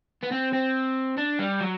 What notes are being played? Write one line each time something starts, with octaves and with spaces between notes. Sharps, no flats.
B3
C4
C4
D4
G3
F#3